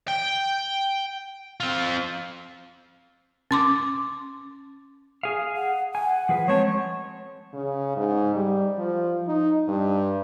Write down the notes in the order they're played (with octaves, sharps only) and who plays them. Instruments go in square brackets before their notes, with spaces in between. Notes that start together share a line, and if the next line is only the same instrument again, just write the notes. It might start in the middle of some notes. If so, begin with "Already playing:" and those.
[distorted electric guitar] G5
C4 F4
[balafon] C#4 C6 D6
[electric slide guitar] G#4 F5
[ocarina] F#5
[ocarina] F#5 [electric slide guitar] G#5
[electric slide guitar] F3 G#4 B4
[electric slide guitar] G#3 C4 A5 [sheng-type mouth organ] C#5
[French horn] C#3
G#2
G3
F3
D#4
G2